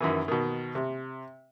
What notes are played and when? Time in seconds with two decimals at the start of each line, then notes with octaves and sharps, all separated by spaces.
0.01 F#2 D#3 E3
0.28 B2 D#3
0.75 C3